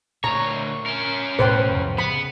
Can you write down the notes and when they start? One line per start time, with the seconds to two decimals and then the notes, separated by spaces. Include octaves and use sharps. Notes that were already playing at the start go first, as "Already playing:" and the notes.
0.24 D2 A#2 C#5 A#5
0.86 C#4 A#4
1.39 E1 A2 A3 B4 C5 G5
1.72 C2 F2 A2
1.98 C#3 B3 B5